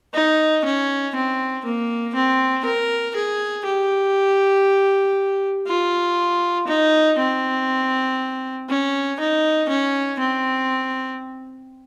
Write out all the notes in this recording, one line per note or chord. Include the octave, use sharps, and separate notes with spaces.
D#4
C#4
C4
A#3
C4
A#4
G#4
G4
F4
D#4
C4
C#4
D#4
C#4
C4